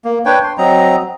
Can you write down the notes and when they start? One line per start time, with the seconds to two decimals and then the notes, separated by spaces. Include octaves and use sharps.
0.05 A#3
0.25 D4 B4 C#5 G5
0.44 C6
0.58 F#3 C4 D#5 A#5